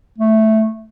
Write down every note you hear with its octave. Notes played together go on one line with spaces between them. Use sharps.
A3